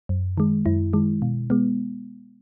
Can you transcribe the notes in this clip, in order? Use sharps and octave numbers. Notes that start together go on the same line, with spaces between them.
F#2
D#3 G#3
F#2 E4
D#3 G#3
B2
G#3 B3